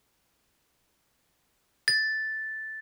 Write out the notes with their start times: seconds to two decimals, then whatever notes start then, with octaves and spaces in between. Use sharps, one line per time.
1.88 A6